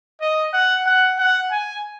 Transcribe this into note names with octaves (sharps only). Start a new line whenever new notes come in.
D#5
F#5
F#5
F#5
G#5